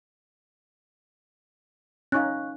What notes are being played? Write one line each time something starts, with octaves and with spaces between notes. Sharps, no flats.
C#4 D#4 F5 C#6 F#6